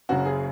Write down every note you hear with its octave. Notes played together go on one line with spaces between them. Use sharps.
F#1 F#2 C#3 F#3 F#4
G#4